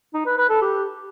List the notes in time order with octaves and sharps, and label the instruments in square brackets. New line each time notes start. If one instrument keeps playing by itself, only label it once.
[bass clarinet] D#4
B4
B4
A4
G4